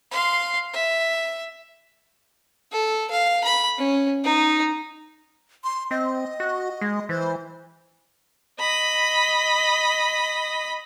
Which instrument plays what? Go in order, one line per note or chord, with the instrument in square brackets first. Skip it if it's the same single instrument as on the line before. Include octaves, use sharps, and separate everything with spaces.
[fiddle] F5 C6
E5
[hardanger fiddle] A4
F5
B5
C#4
D#4
[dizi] C6
[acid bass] C4 [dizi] D#5
[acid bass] F#4
G#3
[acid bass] E3 [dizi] C5
[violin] D#5 B5